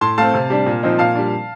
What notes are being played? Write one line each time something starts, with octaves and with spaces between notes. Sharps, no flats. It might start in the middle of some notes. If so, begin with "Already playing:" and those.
A2 A5 C6
A3 C4 F5 A5
C3
G3 D4
A#2
F3 C4 D#4
A#2 F5 A5
G3 D4